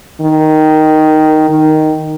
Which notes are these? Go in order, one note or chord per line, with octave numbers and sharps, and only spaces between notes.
D#3
D#3